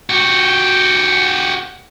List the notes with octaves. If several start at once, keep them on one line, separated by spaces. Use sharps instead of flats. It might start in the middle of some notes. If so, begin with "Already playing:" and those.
F#4 G4